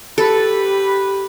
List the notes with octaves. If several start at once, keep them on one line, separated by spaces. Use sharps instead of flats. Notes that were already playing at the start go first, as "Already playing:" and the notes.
G4 A4 B4